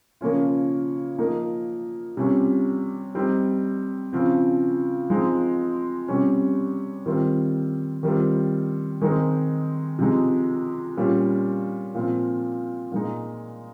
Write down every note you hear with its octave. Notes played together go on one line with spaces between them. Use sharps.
C#3 F3 A#3 C#4 F4
F3 A#3 D#4
C3 G3 C#4 F4
G3 C4 D#4
C#3 F3 C4
F3 G#3 C4 D#4
C3 G3 C#4
D#3 G3 C4 F4
D#3 G3 C4 F4
D#3 G#3 C4 D#4
C3 F3 G#3 D#4
A#2 G3 C#4 F4
A#2 F3 C4 F4
A#2 G#3 D#4